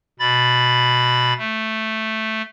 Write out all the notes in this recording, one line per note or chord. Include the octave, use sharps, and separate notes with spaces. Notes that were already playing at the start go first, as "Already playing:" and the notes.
B2 B5 A6
A3